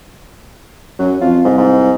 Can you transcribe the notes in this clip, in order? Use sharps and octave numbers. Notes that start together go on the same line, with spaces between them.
F#2 F#3
F2 F4
C2 G#2
G#2